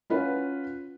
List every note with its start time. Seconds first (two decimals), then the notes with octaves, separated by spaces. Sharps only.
0.10 C#4 F4 B4 F#5